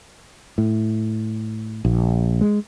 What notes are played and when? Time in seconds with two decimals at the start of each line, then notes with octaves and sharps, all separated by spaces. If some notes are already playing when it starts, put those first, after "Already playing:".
0.58 A2
1.85 A#1
2.41 G#3